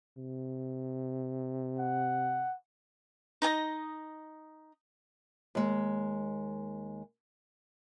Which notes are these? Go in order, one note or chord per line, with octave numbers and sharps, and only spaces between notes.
C3
F#5
D#4 D#5 G#5 D#6
D#2 G#3